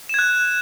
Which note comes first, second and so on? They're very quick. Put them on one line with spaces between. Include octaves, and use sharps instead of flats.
E7 G#6 F#6